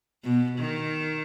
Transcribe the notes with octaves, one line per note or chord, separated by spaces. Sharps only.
B2
D#3